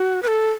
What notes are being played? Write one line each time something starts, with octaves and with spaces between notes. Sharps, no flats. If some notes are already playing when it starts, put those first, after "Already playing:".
Already playing: F#4
B4
A4